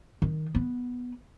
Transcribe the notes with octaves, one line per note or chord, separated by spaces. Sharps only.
D#3
B3